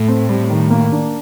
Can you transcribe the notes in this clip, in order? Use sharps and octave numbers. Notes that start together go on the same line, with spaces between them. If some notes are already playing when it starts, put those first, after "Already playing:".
Already playing: A2 A3
C4
G3
D#3
A#3
D4